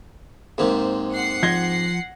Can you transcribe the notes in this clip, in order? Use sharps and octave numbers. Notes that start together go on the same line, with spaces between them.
G#2 C3 A#3
F#5 C7
F3 G#6 A#6 G7